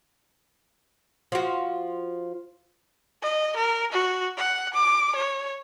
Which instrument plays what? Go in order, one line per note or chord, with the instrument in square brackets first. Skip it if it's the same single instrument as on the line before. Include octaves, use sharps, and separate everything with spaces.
[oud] F3 F#4
[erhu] D#5
A#4
F#4
F#5
D6
C#5